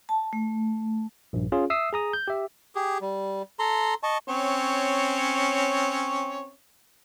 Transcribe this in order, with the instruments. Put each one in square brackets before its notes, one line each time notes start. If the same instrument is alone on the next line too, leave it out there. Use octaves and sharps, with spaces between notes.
[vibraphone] A5
A3
[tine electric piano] A#1 G2
C#4 F4 G#4
E5 D#6 E6 C7
G#4 A#5 D#6
G6
G4 E5
[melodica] G4 G#4
G3
A4 A#5 C6
D#5 A5 C#6
[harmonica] C4 C#4 C#5